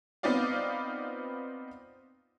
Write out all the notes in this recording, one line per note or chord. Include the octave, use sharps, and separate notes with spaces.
B3 C4 D#4 F4 D5 F5